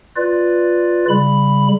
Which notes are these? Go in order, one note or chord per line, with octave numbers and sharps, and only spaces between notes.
F4 B4 D5
C#3 G3 B5